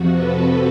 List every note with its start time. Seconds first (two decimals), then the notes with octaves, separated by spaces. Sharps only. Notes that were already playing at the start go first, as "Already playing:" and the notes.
Already playing: F2 C3 F3 F#4
0.13 A4 B4